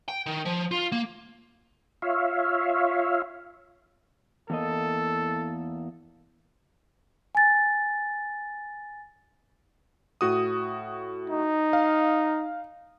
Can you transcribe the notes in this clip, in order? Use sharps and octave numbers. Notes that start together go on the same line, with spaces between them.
G5
D#3
F3
F4
A#3
F4 C#5 E5 F5
E2 A#3 A4 D#5
G#5 A6
A2 F#4 D#6
D#4
F5